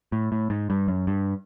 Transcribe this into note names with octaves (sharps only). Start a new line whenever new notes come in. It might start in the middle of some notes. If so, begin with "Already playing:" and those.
A2
A2
G#2
G2
F#2
G2